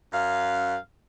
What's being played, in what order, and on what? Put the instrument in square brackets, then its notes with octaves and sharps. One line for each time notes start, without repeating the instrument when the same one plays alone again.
[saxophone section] F#2 F5